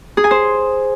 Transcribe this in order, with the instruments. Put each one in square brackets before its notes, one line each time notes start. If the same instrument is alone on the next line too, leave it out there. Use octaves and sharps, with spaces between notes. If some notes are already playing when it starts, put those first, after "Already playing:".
[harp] G#4
G#5
C5